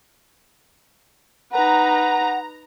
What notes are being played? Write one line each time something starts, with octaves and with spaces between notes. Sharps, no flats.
D#4 B4 F#5 A#5